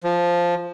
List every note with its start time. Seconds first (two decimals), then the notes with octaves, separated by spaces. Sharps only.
0.04 F3